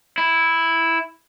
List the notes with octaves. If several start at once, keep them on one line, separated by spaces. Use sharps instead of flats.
E4